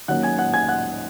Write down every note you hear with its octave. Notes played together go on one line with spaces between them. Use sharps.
D#3 F#3 A#3 C#4 F#5 F#6
G#5 G#6
F#5 F#6
G#5 G#6
F#5 F#6